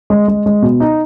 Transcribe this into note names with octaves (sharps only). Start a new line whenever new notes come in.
G#3
G#3
G#3
B2
D#4